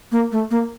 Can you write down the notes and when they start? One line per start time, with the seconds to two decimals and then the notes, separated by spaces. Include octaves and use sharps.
0.12 A#3
0.32 A3
0.51 A#3